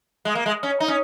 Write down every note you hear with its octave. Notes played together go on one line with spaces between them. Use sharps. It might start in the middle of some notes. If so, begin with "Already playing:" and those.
G#3
A#3
G#3
C#4
D#4
C#4